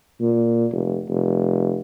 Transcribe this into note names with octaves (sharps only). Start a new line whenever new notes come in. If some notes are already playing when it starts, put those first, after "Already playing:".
A#2
F1
F1